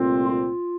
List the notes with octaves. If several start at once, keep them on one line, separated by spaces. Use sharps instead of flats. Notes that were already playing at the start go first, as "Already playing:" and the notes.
Already playing: C2 A#2 A3 C4 F4
F4